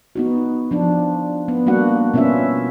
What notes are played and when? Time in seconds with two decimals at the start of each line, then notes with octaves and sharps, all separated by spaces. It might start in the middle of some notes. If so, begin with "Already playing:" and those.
0.15 B3 D#4 F#4
0.71 F3 D4
1.48 B3
1.66 G3 A#3 D4 F#4 F#5
2.14 B2 B3 C#4 F4 E5